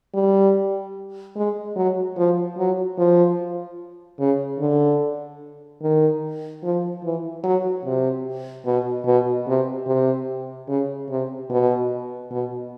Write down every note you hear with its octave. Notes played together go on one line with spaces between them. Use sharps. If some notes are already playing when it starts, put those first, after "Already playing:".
G3
G#3
F#3
F3
F#3
F3
C#3
D3
D#3
F3
E3
F#3
C3
B2
B2
C3
C3
C#3
C3
B2
B2